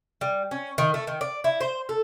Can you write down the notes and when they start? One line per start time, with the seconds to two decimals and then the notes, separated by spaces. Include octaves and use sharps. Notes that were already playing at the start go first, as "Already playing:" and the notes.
0.21 G3
0.51 C#4
0.78 D#3
0.94 A3
1.07 D#3
1.21 D5
1.44 E4
1.61 C5
1.89 A4